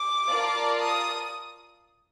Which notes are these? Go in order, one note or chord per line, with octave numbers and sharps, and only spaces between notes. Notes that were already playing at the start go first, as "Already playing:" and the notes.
Already playing: D6
F4 A#4 D5 F5 A5
D#6